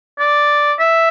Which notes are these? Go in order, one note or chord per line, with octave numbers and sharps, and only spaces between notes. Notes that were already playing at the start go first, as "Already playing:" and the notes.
D5
E5